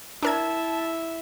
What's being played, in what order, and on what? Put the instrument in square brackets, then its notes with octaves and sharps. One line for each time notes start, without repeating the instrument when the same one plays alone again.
[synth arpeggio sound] D4 A#4 G#6 [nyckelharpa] E4 E5 [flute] A5